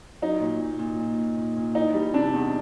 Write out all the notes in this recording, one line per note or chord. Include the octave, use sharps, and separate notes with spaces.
F#3 D#4
A#2
A#2
A#2
A#2
A#2
A#2
A#2
E3 D#4
G3
C3 D4
E2